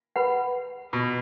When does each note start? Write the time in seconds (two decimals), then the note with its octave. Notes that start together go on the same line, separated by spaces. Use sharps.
0.16 B4 F#5 B5
0.93 B2